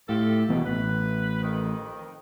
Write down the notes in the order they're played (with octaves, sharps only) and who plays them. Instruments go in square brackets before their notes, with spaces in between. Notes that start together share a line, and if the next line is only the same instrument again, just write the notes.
[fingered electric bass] A2 [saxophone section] F4 G4 A4
[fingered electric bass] B1 E3 B3 [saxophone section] B2
[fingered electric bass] A1 [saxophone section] B4
[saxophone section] F2 D#3